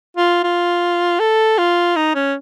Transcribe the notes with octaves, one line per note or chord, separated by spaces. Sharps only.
F4
F4
A4
F4
D#4
C#4